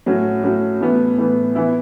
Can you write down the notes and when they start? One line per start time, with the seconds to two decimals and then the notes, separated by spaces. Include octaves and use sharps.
0.06 A2 F#3 C#4 F#4
0.43 A2 F#3 C#4 F#4
0.81 A2 E3 B3
1.18 A2 E3 B3
1.55 E3 B3 E4